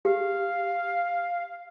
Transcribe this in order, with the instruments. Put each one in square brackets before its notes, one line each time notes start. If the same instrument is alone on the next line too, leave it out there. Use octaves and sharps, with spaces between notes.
[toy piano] G4 [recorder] F5